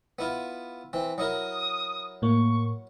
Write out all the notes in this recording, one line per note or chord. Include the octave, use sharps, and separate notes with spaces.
B3 E4 F4
E3 C4
F#3 E4 A#4 D#6
A2 A#3 C#6